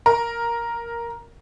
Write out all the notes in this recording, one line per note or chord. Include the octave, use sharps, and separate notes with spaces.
A#4